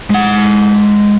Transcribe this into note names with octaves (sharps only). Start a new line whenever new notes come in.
G#3 F#5